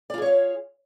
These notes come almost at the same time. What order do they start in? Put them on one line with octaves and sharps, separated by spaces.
D5 F4 G#4 C#5 F5